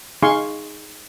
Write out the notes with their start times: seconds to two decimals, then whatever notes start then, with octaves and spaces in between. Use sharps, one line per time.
0.23 D#4 G#4 F5 G#5 C6 C#6